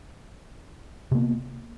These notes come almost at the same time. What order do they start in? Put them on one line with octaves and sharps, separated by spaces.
C3 A#3 B3